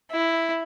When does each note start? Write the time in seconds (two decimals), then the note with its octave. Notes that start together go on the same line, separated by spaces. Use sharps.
0.12 E4